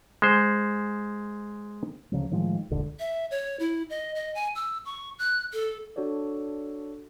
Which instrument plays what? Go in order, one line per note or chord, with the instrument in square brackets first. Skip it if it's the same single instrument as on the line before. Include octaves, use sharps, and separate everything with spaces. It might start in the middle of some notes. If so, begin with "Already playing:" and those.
[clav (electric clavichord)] G#3 C5
[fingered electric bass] D2 C#3 F3 F#3
A2 D#3 F3 G#3
F1 C#2 A#2 D3
[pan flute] E5
C#5
E4
D#5
D#5
G#5
E6
C#6
F#6
A4
[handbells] D4 F#4 A4 C#5 D5